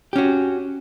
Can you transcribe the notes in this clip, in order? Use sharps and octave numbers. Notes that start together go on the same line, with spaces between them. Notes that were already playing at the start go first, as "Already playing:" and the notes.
C#4 F#4 G4